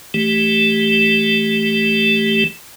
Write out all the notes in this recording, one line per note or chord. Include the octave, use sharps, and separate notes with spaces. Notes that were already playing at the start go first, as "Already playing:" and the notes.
E3 A3 G4